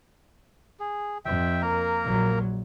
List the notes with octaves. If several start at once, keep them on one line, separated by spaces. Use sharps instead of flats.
G#4
F2 E5 G5
A#3 A#4 A#5
A#1 F#3